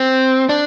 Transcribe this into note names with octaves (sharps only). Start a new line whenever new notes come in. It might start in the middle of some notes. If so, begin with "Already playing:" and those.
Already playing: C4
D4